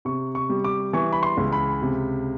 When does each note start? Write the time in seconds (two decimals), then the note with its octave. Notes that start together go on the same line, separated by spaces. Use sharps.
0.05 C3 C#6
0.35 C#6
0.49 G3
0.64 D6
0.93 E3 C#6
1.13 B5
1.23 C6
1.37 C#2
1.53 B5
1.82 C3